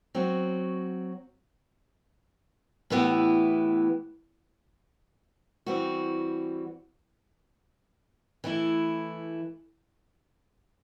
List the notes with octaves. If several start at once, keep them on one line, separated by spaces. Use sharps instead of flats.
F#3 C4 F#4
A2 E3 B3 E4 G4
E3 G3 C4 F#4
E3 A3 E4